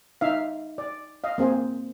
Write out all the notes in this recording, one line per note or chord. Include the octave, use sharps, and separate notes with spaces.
D#4 E5 F5
D5
D#5 F5
A#3 C4 G#4 C5